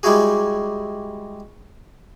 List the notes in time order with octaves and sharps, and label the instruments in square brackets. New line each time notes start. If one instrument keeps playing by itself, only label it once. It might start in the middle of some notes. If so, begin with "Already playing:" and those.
[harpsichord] G3 G#3 E4 F#4 G#4